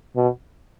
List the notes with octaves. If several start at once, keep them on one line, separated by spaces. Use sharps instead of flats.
B2